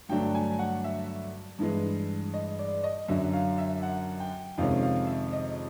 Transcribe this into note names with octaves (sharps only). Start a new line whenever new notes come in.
G2 D3 F#3 A3 D4 G5
G#5
F#5
E5
G2 E3 G#3
D#5
D5
D#5
F#2 D3 F#3 E5
F5
E5
F#5
G5
F2 C3 D#3 G#3 C#4 F5
F5
E5
D#5